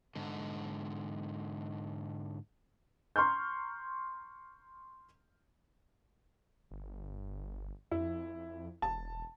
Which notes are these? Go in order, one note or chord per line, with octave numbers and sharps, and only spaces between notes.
G#2 D3
A#5 C6 C#6 F6 G6
G1
F2 E4
E1 A5